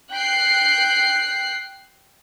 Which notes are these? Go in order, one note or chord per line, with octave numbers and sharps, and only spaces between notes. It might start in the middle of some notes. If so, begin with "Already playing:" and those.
G5 F#6 C7